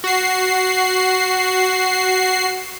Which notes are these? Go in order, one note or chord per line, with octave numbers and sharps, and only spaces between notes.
F#4 C7